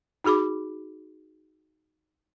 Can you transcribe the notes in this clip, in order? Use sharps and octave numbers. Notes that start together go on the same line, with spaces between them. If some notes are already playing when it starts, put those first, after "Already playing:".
D#4 F#4 G#4 B5 D6